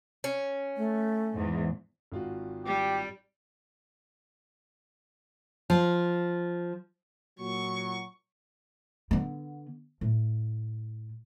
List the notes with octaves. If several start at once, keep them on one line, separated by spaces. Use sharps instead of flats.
C#4
A3
E2 G#2
G#1 F4 F#4
G3 G4
F3
A#2 F#3 C#6
D3 B3
A2